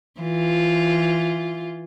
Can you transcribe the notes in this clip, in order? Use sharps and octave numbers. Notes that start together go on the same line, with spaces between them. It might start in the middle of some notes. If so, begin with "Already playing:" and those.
E3 F4